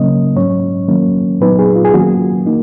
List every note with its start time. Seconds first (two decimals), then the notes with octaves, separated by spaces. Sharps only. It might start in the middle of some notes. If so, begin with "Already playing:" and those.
Already playing: C#3 F#3 A#3 C#4 D#5
0.36 G#2 F#3 C#4 C#5
0.88 D#3 F#3 A#3 C#4
1.40 A#2 F#3 B3 D#4 B4
1.59 G#4
1.76 F4
1.85 G#4
1.94 D#3 F#3 A#3 C#4 F#4
2.46 A#3 D#4